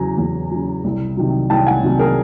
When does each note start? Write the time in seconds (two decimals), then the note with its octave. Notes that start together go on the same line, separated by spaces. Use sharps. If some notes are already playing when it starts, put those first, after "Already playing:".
Already playing: E2 C#3 F#3 G#5 A#5
0.18 E2
0.51 C#3 F#3
0.84 C2
1.17 C3 D#3 F#3
1.50 C2 G5 A5
1.67 F#5 G#5
1.83 C3 D#3 F#3
1.99 G#4 A#4